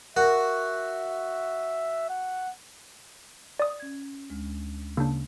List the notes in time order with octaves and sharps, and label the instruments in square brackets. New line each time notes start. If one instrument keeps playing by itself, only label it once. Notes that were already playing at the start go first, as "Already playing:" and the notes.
[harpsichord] F#4 [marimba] A#4 [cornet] E5
[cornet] F#5
[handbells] D5 D#6
[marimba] C#4 G#6
D2 G#3
[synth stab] C#3 [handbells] A#3 D4